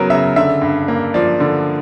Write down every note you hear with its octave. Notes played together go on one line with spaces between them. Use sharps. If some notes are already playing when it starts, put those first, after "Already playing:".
Already playing: C#3 F#3 B3 A#4
C#3 E5
D3 E5
G2
A#3
F3 D5
D3